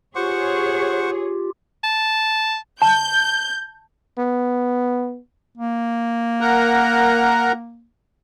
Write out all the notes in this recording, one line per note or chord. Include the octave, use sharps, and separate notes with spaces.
F4 G4 G#4 C5 C#5 F#5 C#6
A5
A5 G6
B3
A#3
A#4 F#5 A#5